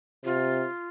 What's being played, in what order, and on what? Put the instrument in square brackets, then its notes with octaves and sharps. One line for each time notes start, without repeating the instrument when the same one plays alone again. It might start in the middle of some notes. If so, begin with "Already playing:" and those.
[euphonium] C3 [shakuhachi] F4